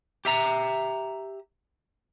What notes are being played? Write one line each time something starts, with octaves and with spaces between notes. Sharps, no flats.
G4 E5 A#5